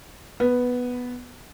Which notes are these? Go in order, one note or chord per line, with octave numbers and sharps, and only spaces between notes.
B3